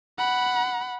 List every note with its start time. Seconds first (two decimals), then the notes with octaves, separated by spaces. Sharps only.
0.18 F#5 B5